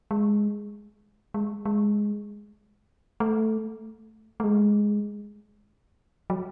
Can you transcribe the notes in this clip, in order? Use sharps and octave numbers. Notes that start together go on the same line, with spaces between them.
G#3
G#3
G#3
A3
A3
G#3
F#3